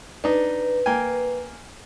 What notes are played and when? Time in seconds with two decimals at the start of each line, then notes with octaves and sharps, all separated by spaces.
0.24 D4 D#4 B4
0.86 A#3 G5 G#5